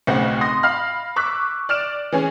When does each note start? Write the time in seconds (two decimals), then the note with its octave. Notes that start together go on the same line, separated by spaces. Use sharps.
0.07 B1 A2 C#3 C4 F#5
0.41 C6 D#6 A#6
0.63 F5 B5 F6
1.16 C#6 D6 E6 F#6 B6
1.69 D5 F6 D7 E7
2.12 E3 C#4 G#4